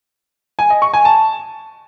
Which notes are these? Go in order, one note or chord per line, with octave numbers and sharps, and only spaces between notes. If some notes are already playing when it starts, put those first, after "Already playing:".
G#5
D#5
C#6
G#5
A5